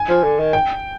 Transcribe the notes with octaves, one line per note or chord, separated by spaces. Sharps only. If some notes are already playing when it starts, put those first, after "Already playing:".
Already playing: G#5
F3
D3
D#3
G5